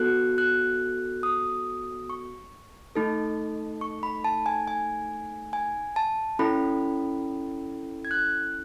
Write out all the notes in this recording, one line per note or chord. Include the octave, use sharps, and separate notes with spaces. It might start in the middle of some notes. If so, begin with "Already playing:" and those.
Already playing: B3 F#4 A4 F#6
F#6
D#6
C#6
A3 D#4 A4
C#6
B5
A5
G#5
G#5
G#5
A5
C#4 E4 A4 B5
G#6
F#6